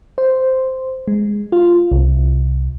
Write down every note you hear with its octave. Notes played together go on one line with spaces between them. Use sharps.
C5
G#3
F4
C2